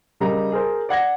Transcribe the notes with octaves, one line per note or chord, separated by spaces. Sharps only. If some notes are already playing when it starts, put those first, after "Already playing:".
C#3 G3 A#4 D#5 A#5
G#4 A#4 C5
D5 F#5 G#6 A#6